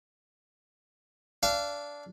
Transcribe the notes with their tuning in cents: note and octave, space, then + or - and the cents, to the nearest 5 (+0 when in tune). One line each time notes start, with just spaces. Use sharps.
D4 -15 F5 -30